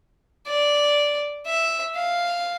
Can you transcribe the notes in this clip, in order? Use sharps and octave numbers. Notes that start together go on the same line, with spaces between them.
D5
E5
F5